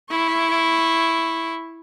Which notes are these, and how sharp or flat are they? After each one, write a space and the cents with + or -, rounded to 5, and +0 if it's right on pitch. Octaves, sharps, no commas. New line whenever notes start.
E4 +0 C#6 -20